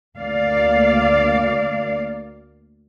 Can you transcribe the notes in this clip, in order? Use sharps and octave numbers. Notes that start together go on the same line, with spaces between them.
D2 A#3 D5 F5